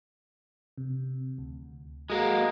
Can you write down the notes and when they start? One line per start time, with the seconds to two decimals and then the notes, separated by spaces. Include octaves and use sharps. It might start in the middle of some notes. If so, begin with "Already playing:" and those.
0.78 C3
1.38 D2
2.10 G#3 A#3 F#4 G#4 F#5